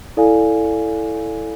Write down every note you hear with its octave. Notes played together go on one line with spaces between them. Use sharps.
E4 A4 D5 F5 G#5